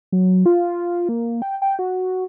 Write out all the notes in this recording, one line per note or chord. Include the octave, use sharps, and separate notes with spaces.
F#3
F4
A#3
G5
G5
F#4